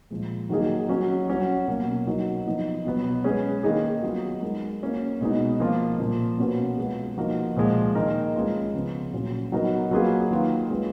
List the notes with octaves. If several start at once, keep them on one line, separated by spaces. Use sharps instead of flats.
A#2 F3 G#3
D#3 F#3 A#3 D#4 G#4
F#3 C#4 F#4
F#3 C#4 F#4
B2 F#3 A#3 C#4
F#3 B3 D#4 A#4
F3 B3 D#4
B2 F#3 B3
G#3 C#4 G#4 B4
D#3 A#3 D#4 G#4
F#3 B3 F4
G#3 D#4 A#4
A#3 C#4 F#4
B2 G#3 B3 D#4
F3 A#3 F4
A#2 F3 A#3
B2 A#3 C#4 F#4 B4
G#3 B3 F4 G#4 B4
F3 A#3 D#4 F#4 A#4
A#2 F3 G#3
D#3 A#3 D#4 A#4
G#3 C#4 F4 B4
C#3 F3 B3
A#2 F#3 C#4
F#3 B3 D#4 A#4
F#3 A#3 F4 G#4 B4
D#3 A#3 F4 B4
G#3 C#4 F4 B4